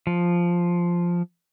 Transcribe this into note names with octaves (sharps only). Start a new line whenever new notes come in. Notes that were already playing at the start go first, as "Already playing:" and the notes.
F3